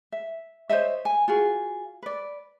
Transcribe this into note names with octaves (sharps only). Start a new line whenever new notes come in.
E5
C5 C#5 D#5 E5
G#5
F4 F#4 G#4
B4 D5